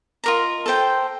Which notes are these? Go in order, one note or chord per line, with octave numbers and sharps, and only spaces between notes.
F4 A#4 D#5 A#5
A4 C5 G5